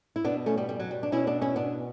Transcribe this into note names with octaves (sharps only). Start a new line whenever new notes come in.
E4
B2 B3 D4
A3 C#4
G3 B3
G3
F#3
G3
D4
B2 C#4 E4
B3 D4
C#4 E4
B3 D4